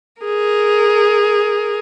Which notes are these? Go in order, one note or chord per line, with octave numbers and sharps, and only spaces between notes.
G#4 A#4